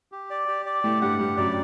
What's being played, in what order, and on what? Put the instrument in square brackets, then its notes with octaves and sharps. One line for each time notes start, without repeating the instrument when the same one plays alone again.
[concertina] G4
D5
G4
D5
[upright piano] A2 A3 [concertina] G4
[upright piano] G2 G3 [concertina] F#5
[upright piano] G2 G3 [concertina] G4
[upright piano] F#2 F#3 [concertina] D5